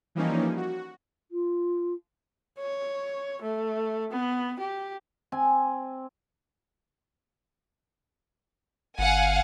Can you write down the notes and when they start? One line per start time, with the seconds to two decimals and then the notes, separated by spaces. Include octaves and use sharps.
0.15 E3 F3 G3 A#3 C#4 D#4
0.57 F#4
1.31 F4
2.59 C#5
3.42 A3
4.11 B3
4.60 G4
5.32 C4 G#5
8.99 G1 F5 F#5 G#5